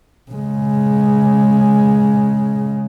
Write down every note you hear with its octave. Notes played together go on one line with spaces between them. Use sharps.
C#3 G#3